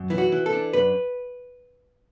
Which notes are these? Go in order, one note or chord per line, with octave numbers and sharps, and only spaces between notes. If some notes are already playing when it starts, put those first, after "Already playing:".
Already playing: F#2
E3 E4
F#4
E3
A4
D4
F#2 B4